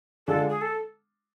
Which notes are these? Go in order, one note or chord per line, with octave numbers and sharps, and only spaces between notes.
D3 G#3 D4 F4 A4
G#4
A4